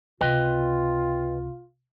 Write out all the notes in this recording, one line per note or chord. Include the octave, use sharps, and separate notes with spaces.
C#2 C3 F4 B4 D#5 G5